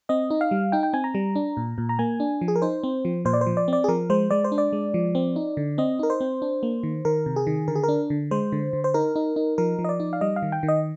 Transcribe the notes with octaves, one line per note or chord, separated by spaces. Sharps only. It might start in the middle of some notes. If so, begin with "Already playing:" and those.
C4 D#5
D#4
F5
G3
D#4 G5
G5
C4 G#5
A#5
G3
D4
A#2
A#2
A#5
A#3 G#5
D4
F3
G#4
A#4
D#4 C5
C4
F3
A#2 C5
D5
C5
F3
D5
C4 D5
G#4
F3 A#4
G#3 C5
G#3 D5
C5
D4
D5
G#3
F3
C4
D#4
D3
C4 D#5
D#4 A#4
C5
C4
D4
A#3
D#3
D#3 A#4
C3
G#4
D#3
D3 A#4
G#4
A#4
D4
D3
G#3 C5
D3
D3
C5
D#4 A#4
D#4
D#4
F3 A#4
F3
D#5
D5
D#4
F5
G3 D#5
F5
D#3
G5
D#3
D#5